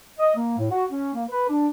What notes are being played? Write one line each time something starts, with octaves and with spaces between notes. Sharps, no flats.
D#5
A#3
A2
F#4
C#4
A#3
B4
D4